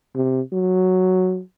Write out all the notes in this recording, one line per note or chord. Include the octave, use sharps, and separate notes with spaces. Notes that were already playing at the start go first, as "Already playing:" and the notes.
C3
F#3